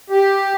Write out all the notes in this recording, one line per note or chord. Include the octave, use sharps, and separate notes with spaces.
G4